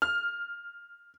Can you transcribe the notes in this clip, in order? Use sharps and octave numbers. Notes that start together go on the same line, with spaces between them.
F6